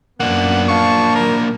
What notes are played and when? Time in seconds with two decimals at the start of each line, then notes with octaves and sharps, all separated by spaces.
0.20 F#2 A#3 B3 D4 F#5
0.68 F4 F5 A5 C#6
1.16 A#2 D#3 F#3 A#4